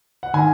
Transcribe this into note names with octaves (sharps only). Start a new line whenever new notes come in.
F#5
D#3 G#5